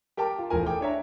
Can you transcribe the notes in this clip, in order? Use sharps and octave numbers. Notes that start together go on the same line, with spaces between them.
G4 A#4 G5 A5 D6
F4
E1 A2 F3 A#4 G#5
G#4 A4 G5 D6
D4 C#5 E5 A#5